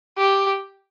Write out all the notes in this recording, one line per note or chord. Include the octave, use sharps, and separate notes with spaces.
G4